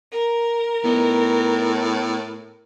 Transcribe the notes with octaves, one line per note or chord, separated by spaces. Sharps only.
A#4
A2 B3 D#4 A4